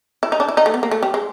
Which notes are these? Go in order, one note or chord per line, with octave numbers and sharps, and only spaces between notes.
E4
D#4
D4
E4
D#4
A3
B3
A#3
A3
G3
G#3